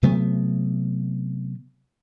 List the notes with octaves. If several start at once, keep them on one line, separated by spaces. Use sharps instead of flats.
C3 F#3 A3 B3